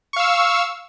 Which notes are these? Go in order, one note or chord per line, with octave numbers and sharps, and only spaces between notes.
F5 C#6 E6